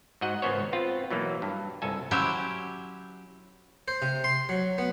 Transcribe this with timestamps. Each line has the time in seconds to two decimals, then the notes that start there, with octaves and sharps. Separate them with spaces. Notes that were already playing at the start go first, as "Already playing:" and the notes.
0.21 G#2 F#4 D#5 F#5
0.42 G#1 C#3 B3 C#4 C5 C#5
0.73 B3 C4 F4
1.11 B2 E3 F#3 A#3
1.42 G2
1.82 G1 C2 A4 G#5
2.11 F#3 C#4 E4 G4 C5 E5
3.88 C5
4.02 C3
4.24 C6
4.49 F#3
4.78 B3